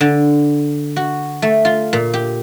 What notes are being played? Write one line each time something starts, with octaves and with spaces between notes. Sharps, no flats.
D3
F#4
A3
F4
A#2
G4